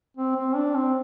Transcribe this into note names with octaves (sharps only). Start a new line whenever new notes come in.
C4
C4
D4
C4